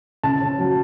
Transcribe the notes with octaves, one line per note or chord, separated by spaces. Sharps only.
C#3 A5
C#4
F#3